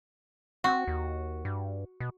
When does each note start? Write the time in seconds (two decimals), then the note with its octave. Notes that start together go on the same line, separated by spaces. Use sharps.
0.64 C4 F#4
0.88 D#2
1.45 G2
2.00 B2